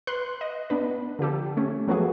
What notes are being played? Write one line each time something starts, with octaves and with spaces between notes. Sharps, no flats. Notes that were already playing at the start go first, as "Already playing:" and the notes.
B4 C6 F#6
D#5
B3 D4 B4
D3 F3 G4 A4
A3 C#4
F3 F#3 A3 B3 F#4 G#4